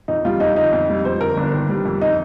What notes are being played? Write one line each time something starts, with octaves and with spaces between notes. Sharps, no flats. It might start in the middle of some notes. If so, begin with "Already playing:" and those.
F2 D#4
G3 F4
F2 D#4
D3 D#4
F2
G3
F2 C5
D3 A#4
G1 D4
D#3
G3
F2
D#4